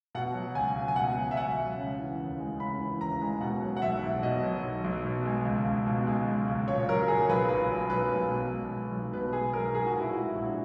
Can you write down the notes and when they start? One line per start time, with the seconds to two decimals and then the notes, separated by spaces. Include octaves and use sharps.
0.15 B2 F#5
0.34 F#3
0.55 C#2 G#5
0.76 C#2
0.88 G#5
0.96 B2 F#5
1.17 F#3
1.31 E5
1.37 C#2 F#5
1.58 C#2
1.78 C#3
1.99 E3
2.19 D#2
2.39 G#3
2.60 C#3 B5
2.80 E3
3.00 D#2 A#5
3.21 G#3
3.41 B2 F#5
3.62 F#3
3.77 F#5
3.82 B1 E5
4.03 B1
4.23 B2 D#5
4.43 F#3
4.63 B1
4.84 B1
5.05 B2
5.25 G#3
5.45 C#2
5.66 C#2
5.87 B2
6.07 G#3
6.27 C#2
6.48 C#2
6.67 A#2 C#5
6.88 F#3 A#4
7.08 B1 G#4
7.29 B1 B4
7.49 A#2 B4
7.70 F#3
7.90 B1 B4
8.11 B1
8.31 B2
8.52 G#3
8.72 B1
8.92 B1
9.12 B2 B4
9.33 G#3 G#4
9.53 B1 A#4
9.74 B1 G#4
9.87 F#4
9.94 A#2
10.01 E4
10.13 G#3 F#4
10.35 A#1